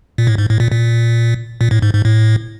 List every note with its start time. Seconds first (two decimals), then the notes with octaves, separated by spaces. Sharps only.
0.18 A#2
0.27 A2
0.38 G#2
0.50 A2
0.60 A#2
0.72 A#2
1.61 A#2
1.71 A2
1.82 G#2
1.94 G#2
2.05 A2